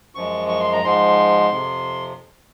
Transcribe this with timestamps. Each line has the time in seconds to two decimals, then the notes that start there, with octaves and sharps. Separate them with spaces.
0.15 F#2 F3 G#3 C#6
0.48 C#6
0.60 C6
0.73 A#5
0.83 G#2 F3 G#3 C6
1.49 F2 C3 F3